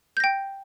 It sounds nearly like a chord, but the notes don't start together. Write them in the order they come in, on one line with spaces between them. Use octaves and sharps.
G6 A#6 G5